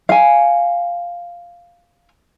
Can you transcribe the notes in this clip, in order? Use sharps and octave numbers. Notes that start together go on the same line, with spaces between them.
F5 G#5